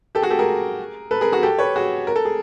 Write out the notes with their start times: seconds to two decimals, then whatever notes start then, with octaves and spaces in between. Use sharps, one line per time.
0.15 G4 A4
0.22 F#4 G#4
0.30 G4 A4
0.39 G#4 A#4
1.11 A4 B4
1.21 G#4 A#4
1.32 F#4 G#4
1.43 G4 A4
1.59 B4 C#5
1.76 F#4 G#4
2.07 A#4
2.16 A4
2.25 G#4